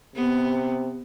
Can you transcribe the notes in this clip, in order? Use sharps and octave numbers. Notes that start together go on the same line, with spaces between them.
C3 B3